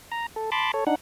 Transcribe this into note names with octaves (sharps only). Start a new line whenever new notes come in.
A#5
A4
A5 B5 C6 D6
A4 C#5
D4 D#4 F#5